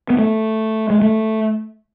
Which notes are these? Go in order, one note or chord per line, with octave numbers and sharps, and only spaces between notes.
B3
A3
G#3
A3